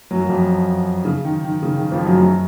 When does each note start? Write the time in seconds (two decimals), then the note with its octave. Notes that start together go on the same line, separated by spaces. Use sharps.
0.11 F#2 F#3
0.21 F#3
0.29 F2 F3
1.05 C#3
1.25 D#3
1.44 D#3
1.63 C#3
1.77 D#3
1.92 F2 F3
2.05 F#2 F#3
2.20 F#2 F#3